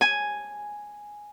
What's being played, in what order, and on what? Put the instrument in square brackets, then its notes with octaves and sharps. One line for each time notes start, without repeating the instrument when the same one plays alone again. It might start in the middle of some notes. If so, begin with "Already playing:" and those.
[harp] G#5